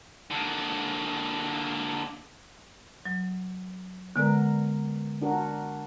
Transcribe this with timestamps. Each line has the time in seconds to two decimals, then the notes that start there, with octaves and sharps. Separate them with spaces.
0.31 D3 A#3
3.05 F#3
4.16 D3 G#3 B3 A#4 D5
5.21 D4 F#4 A#4